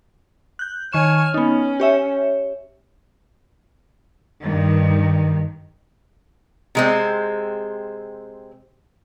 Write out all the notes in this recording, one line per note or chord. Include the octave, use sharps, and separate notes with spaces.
F#6 G6
D#3 C#5 G#5 C#6 F6 E7
B3 C#4 D#4
G4 C#5 E5
G2 D#3
C3 G#3 C4